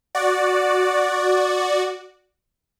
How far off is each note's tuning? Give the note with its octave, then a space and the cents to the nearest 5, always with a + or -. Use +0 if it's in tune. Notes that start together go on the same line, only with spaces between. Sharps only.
F#4 -5 D5 +0